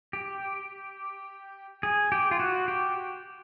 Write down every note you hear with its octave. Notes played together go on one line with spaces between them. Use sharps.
G4
G#4
G4
F4
F#4
G4